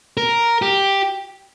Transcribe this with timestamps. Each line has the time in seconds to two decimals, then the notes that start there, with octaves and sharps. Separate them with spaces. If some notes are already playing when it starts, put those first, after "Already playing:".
0.17 A#4
0.62 G4